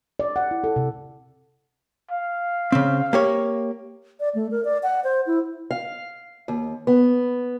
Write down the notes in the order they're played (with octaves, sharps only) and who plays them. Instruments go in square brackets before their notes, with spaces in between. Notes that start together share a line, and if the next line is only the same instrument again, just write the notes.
[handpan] D5
F#5
E4
A4
C3
[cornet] F5
[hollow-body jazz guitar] C#3 C4
A#3 G4 C#5
[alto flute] D5
A3
A#4
D5
F#5
C5
E4
[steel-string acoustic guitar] F5
D#2
B3